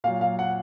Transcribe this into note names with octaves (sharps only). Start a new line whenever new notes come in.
A#2 F#3 F5
F5
F#5